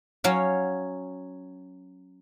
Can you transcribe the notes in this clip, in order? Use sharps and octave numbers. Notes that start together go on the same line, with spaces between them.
F#3 C#4 C#5 F5